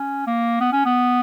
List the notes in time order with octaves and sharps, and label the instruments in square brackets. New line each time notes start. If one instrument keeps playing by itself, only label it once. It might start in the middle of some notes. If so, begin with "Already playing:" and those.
Already playing: [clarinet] C#4
A#3
B3
C#4
B3